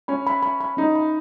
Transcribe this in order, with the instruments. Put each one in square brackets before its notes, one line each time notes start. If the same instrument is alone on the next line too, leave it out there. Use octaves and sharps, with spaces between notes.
[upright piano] C#4 [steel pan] B5
[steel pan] B5
B5
B5
[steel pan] C#4 [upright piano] D#4
[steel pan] B5